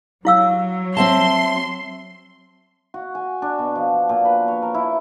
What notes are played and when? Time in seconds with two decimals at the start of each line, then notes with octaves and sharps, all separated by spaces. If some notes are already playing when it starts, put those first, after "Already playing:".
0.25 F#3 E4 F5 E6
0.97 C4 E5 A5 C6
2.94 F#4
3.15 G#5
3.42 D4
3.59 B2
3.75 F3
4.09 A#2
4.25 B4
4.48 C#5
4.62 A#4
4.74 E4